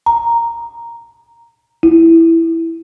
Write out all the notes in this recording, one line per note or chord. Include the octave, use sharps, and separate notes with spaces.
A#5
E4